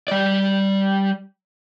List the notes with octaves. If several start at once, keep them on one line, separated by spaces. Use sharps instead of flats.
G3 D5